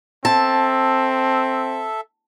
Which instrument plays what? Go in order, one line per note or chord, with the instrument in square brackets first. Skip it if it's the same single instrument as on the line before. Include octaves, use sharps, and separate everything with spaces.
[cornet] C4 [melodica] A4 E5 [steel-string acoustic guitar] A5